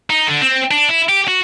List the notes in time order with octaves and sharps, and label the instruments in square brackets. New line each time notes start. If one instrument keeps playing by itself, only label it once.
[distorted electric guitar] D#4
D3
C4
D4
E4
G4
F#4